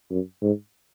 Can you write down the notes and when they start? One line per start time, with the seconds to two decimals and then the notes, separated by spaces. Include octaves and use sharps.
0.11 F#2
0.42 G#2